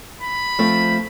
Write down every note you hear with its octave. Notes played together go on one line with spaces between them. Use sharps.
B5
F3 A3 C4